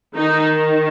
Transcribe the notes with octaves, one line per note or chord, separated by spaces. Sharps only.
D#3 D#4